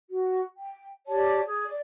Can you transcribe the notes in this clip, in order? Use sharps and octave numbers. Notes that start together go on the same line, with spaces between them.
F#4
G5
G4 C#5 D5 A5
G#4
D5